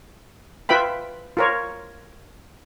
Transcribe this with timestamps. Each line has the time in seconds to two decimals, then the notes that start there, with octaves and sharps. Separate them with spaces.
0.69 F4 B4 E5 G5 B5
1.37 F4 A#4 C#5